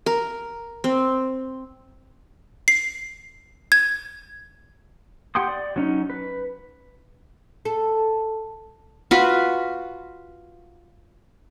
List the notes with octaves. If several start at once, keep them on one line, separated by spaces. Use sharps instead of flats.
A#4
C4
C7
G#6
G4 F#5 G5 C6 D#6
D5
F#3 C#4 D#4
B4
A4
F4 F#4 B4